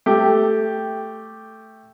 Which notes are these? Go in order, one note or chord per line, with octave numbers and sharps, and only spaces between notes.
A3 G4